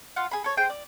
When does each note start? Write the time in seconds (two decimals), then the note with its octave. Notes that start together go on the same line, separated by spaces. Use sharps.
0.16 F4 F5 F#5
0.31 G#4 B5
0.44 A4 C#5
0.57 G#4 C5 G5
0.70 D5